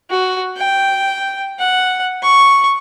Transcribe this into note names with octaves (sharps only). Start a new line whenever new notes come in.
F#4
G5
F#5
C#6